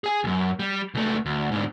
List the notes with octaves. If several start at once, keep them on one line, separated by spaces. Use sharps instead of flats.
G#4 G#5
C#2 F#2
G3
C#2 A3
D2
G#2 D3